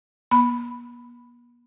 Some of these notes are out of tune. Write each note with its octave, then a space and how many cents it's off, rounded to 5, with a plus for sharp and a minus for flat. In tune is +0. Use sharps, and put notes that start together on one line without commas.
B3 -45 B5 +0